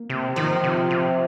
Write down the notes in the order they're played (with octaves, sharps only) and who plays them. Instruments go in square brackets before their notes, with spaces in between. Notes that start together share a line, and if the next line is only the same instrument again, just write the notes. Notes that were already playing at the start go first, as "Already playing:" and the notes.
Already playing: [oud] A#3
[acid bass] C3
[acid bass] D#3 [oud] F3
[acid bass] C3
C3